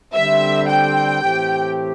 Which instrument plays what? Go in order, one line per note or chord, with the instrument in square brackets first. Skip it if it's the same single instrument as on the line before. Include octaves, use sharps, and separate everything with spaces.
[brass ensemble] D3 G3 C4 [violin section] E5
[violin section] G5
[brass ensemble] A2 E3 A3 C4 G4